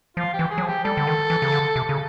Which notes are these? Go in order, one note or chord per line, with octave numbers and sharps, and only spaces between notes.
F3 F4
G4
E3
G#4
F#3
F3
G4
G3 A4
D3
D#3
E3
C#3
D3
C3
C#3